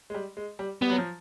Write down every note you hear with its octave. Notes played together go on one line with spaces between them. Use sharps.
G#3
G3
G#3
G3
G3 B3
F#3
F3